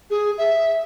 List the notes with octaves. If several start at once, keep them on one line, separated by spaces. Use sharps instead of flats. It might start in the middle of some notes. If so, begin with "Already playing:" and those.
G#4
E5